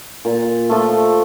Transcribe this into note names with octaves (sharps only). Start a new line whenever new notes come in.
A#2
F3 A3